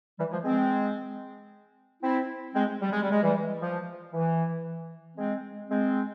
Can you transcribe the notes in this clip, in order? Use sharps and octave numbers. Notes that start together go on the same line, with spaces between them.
E3 G3
F3 G#3
G#3 C4
C4 E4
G#3 C4
G3
G#3
G3
G#3
E3 G3
F3
E3
G#3 C4
G#3 C4